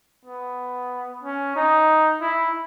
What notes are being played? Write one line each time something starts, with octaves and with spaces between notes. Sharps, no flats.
B3
C#4
D#4
E4